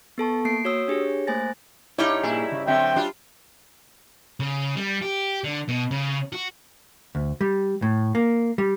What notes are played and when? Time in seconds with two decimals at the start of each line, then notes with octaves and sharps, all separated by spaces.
0.18 B3 A4 A5 C#6
0.45 A#3 C7 D7
0.65 F#4 C#5 D#6 E6
0.88 D4 G4 G#4 C#5
1.27 A3 A#3 C5 G#5 A6 A#6
1.98 G2 G3 D#4 E4 C#5
2.23 A#2 E4 G#4
2.52 C#3
2.67 D3 F#3 C4 E5 G5
2.96 G3 D4 F4
4.40 C#3
4.77 G3
5.02 G4
5.44 D3
5.69 B2
5.91 C#3
6.32 F#4
7.15 D2
7.41 G3
7.82 A2
8.15 A#3
8.58 G3